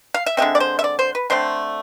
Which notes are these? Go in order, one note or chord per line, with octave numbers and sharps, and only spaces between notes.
F5
E5
D3 G#3 C4 E5
D5
C5
E5
D5
C5
B4
D3 A3 C4 C5